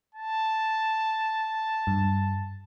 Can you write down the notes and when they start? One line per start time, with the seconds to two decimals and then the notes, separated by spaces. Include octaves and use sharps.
0.15 A5
1.87 G2